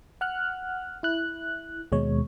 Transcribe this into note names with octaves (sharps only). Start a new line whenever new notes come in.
F#5 F6 F#6
E4 F#6
D#2 B2 G#3 C#5